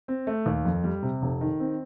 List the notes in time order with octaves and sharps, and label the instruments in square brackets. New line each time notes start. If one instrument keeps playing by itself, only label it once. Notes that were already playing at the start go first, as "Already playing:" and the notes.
[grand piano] C4
A3
D#2
F2
G3
C3
F1
D#3
C4